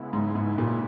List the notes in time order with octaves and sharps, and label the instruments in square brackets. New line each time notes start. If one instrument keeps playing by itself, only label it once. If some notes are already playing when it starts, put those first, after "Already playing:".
Already playing: [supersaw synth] C#3 G#3 B3 E4
[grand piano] G#2
G#2
A#2